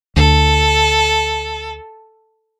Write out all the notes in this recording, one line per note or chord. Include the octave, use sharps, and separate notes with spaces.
D2 A4